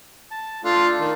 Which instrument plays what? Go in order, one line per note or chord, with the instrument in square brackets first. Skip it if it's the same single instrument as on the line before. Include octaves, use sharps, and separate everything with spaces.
[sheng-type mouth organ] A5
[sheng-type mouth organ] A3 D4 A4 [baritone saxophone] F4
[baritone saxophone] D#3